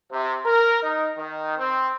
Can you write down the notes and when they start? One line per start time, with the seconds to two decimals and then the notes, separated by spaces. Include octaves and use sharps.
0.12 C3
0.46 A#4
0.83 D#4
1.17 D#3
1.58 C4